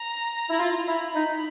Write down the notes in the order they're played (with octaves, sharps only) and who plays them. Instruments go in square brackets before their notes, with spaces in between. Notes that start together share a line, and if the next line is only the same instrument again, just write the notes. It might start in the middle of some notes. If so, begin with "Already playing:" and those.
Already playing: [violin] A#5
[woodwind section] E4
F4
[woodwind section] E4 [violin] B5
[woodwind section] D#4